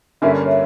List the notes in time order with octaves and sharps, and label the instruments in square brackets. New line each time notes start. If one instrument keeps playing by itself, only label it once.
[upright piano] G2 D3 A#3 C#4 [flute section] E5
[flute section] D5
C#5 E5